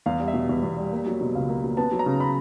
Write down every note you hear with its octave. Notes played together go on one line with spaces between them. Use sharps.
E2 F5
G3
E5
B2
E2
E2
G3
A#3
F#3
B2
C#2 F5
A#3
F#3
B3 A5
F#3
A#5
C#3
B5